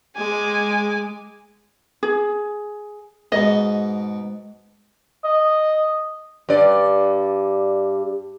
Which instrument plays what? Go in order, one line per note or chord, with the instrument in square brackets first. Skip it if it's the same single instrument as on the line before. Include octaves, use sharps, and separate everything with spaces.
[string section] G#3 [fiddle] G#5 D6
[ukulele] G#4
[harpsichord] G#2 B2 [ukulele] D#5
[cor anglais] D#5
[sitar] G2 D5